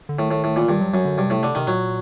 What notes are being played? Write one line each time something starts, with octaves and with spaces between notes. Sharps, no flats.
D3
A2 D#3
A2
A2
A#2
G2 D#3
F#3
F#2 F#3
D3
G2 C3
A2
D3
C3 D#3
A#2 F#3